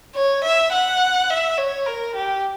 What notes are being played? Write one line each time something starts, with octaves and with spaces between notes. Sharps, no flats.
C#5
E5
F#5
E5
C#5
A#4
G4